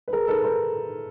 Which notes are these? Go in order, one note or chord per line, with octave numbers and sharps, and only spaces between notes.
B4
G#4 A#4
A4 B4
A#4 C5